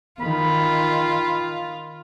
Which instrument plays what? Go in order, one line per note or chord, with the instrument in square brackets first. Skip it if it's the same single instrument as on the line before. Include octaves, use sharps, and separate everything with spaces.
[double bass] D#3 [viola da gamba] F4 [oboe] B5